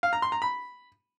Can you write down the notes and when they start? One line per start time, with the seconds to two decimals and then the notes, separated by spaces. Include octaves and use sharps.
0.03 F5
0.13 A#5
0.22 C6
0.32 A#5
0.42 B5